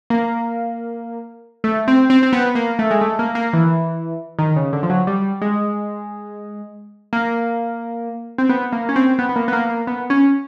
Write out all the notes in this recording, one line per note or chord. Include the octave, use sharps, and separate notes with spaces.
A#3
A3
C4
C4
C4
B3
A#3
A3
G#3
A3
A#3
A#3
E3
D#3
C#3
D3
F3
F#3
G3
G#3
A#3
C4
B3
A#3
C#4
C4
B3
B3
A#3
B3
A#3
A#3
B3
C#4